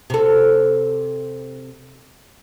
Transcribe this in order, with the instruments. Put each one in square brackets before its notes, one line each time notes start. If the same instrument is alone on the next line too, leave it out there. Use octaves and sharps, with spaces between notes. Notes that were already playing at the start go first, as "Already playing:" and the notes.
[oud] C3 A4